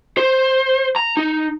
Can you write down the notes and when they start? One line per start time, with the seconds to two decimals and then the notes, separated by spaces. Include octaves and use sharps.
0.17 C5
0.96 A#5
1.17 D#4